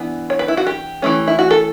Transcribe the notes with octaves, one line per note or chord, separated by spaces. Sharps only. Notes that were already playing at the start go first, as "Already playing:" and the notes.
Already playing: E3 B3 D4
C#5
B4
E4
F#4
G4
E3 A3 C#4
E4
F#4
A4